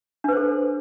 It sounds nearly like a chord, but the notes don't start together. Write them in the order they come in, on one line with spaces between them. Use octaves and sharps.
D4 B4 C5 A4